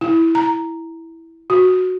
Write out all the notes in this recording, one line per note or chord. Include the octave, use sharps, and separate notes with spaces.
E4
A#5
F#4